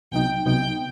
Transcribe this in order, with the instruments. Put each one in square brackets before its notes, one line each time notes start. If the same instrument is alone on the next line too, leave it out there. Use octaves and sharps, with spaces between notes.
[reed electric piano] C2 C3 F#3 B3 D#4 [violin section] G5
[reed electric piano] C2 C3 F#3 B3 D#4 [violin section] G5